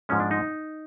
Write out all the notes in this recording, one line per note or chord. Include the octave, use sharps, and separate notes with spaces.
G#2 F3 G#3 C#4
D4
D#4